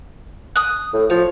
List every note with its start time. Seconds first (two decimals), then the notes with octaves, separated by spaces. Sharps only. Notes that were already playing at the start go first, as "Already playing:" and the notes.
0.56 D#6 F#6
0.93 A2
1.10 F3 C#5